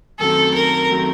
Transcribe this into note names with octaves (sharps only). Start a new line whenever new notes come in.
F#2 D#3 F#3 A3 C4 A4
A#4
D#3 F#3 A3 C4